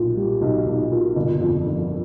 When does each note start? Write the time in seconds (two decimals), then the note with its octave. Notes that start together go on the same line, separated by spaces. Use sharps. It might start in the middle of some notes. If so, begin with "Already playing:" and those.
Already playing: B1 A#2
0.17 G3
0.42 B1
0.67 B1
0.92 A#2
1.16 G1
1.41 F2
1.67 D3